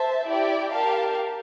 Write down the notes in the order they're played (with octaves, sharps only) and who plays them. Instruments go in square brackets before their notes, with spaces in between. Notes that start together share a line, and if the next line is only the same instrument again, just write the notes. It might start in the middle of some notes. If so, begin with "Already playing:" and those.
Already playing: [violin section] C5 E5 A5
E4 G4 D5 G5
G4 A#4 F5 A5